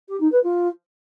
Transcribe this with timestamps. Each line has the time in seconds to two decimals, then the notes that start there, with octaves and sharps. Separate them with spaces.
0.08 G4
0.20 D#4
0.31 B4
0.43 F4